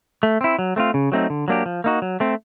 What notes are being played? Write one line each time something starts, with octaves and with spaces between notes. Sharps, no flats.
A3
C4 E4
F#3
A3 C4 F4
C#3
F#3 A3 C4 D#4
D3
F#3 A#3 D4 G4
F3
A#3 D#4 F#4
F#3
A3 C4